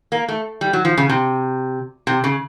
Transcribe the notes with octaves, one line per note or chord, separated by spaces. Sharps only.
A#3
A3
G3
F#3
F3
C#3
C3
C3
C#3